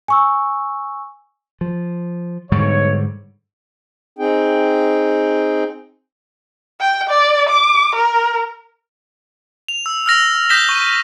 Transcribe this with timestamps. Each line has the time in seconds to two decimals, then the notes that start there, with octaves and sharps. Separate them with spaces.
0.08 G#5 C#6 E6
1.61 F3
2.52 B1 G#2 D3 G3 C#5
4.19 C4 D#4 G#4 G5
6.81 G5
7.10 D5
7.49 D6
7.96 A#4
9.68 F7
9.86 E6
10.06 E6 F6 A#6 F7
10.49 D#6 G6 A#6 B6 E7 G7
10.69 C#6 D#7